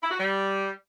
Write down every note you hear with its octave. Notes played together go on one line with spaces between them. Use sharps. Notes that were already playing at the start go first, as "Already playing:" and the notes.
E4
F#4
G3